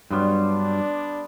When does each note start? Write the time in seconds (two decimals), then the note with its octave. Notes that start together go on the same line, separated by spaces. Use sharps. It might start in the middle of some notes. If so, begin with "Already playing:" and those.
0.11 G2 F#3 G3 B3 C6
0.46 D4